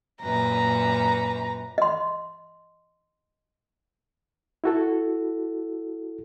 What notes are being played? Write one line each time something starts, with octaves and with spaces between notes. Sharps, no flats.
F#2 A#2 B4 A#5
D#5 C6
E4 F#4 A4